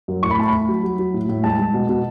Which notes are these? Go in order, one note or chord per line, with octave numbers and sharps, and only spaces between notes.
F#2
A2 C#6
B5
A3 A5
A3 B5
F#3
F#3
F#3
A2
A2
G#3 A5
G#3
B2
B2